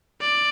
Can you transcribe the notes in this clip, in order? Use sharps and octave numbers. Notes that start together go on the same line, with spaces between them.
D5